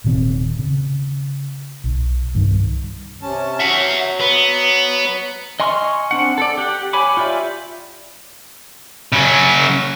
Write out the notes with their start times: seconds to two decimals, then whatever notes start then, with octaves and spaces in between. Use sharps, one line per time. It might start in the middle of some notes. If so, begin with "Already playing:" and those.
0.04 D#1 C3 D#3 C4
0.59 C#3
1.84 B1
2.34 C2 G2 D#3
3.22 C3 C#4 A5
3.60 F#3 E5 F#5
4.20 B3
5.60 D#5 G#5 C6 C#6 F6
6.11 C4 D4 F#5
6.38 A4 D5
6.57 G4 F#5
6.93 C#5 G#5 B5 D6
7.17 F4 G4 D5 E5
9.13 C#3 F#3